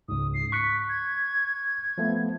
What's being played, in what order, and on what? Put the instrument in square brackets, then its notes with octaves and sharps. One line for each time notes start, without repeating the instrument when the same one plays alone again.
[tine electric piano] C#2 G#2 [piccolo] D#6
[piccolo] C7
[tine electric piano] C#6 F#6 C#7 [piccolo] B6
[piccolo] G#6
[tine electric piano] F3 A3 B3